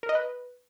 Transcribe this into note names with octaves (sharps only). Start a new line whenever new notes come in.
A#4
D#5
B4